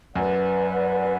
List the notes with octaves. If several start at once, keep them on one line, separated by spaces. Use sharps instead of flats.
F#2 B4 D5 F#5